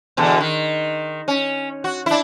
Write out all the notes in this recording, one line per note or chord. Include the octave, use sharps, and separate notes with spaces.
E2 B2 D3
D#3
C#4
F#4
D4 E4